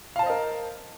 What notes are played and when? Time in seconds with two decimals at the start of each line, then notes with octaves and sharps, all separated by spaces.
0.16 F5
0.19 A5
0.23 C5
0.26 D#5
0.30 A#4